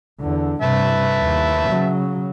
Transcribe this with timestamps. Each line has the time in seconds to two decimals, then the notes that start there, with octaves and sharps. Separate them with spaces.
0.20 E2 D3
0.62 G2 C3 B4 E5 A5
1.18 D#2
1.68 C#3 F#3